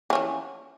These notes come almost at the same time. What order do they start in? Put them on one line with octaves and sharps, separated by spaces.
E3 C#4 F3